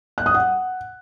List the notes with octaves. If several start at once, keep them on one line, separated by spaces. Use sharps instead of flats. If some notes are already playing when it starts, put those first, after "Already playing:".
F#6
D#6
F#5